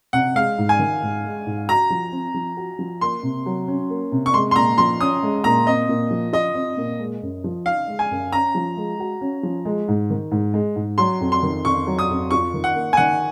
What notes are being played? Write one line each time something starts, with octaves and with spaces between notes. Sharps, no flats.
C3 F#5
G#3 F5
G#2
G#5
D#3
G#2
G#3
G#2
F#4 A#5
F3
C4
F3
F#4
F3
A#3 C6
C3
F#3
C#4
A#3
C3
C#6
G#3 C6
C6
A#2 A#5
F3 C6
C#4 D#6
G#3
A#2 A#5
C4 D#5
A#2
F3
F4 D#5
C4
A#2
G#3
F#2
F3
D#4 F5
G#3
G#5
F#2
C#4 A#5
F3
G#3
F#4
C#4
F3
G#3
G#2
D#3
G#2
G#3
G#2
F#3 C6
F2
C6
D#3
F2 C#6
F#3
D#6
F2
F4 C#6
D#3
F#5
A#3
G#5
D#3 F#5